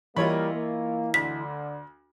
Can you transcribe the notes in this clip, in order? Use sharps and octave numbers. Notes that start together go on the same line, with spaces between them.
E3 G3 A#3 E4 F4 C#5 D#5 B5
A#3
D2 D3 B6